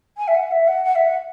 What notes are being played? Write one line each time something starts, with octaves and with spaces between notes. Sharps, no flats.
G#5
E5
F#5
E5
F#5
F#5
E5
F#5